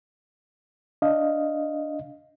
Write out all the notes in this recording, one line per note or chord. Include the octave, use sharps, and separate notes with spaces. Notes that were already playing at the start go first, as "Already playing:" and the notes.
D4 D#5 F5